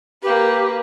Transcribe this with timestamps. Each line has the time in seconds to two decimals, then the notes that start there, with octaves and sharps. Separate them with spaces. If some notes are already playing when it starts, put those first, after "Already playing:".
0.22 A#3 G4 B4